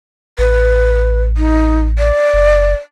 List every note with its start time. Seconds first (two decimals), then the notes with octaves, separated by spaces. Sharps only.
0.39 A1 B4
1.37 D#4
1.98 D5
2.34 F#1